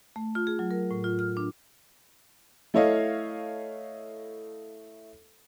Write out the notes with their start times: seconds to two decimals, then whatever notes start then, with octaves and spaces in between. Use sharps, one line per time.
0.16 A3
0.35 F4
0.47 G#4
0.59 F#3
0.71 A#4
0.91 A2
1.04 F4
1.19 F6
1.37 D4
2.74 A3 E4 A4 C#5 D#5 F5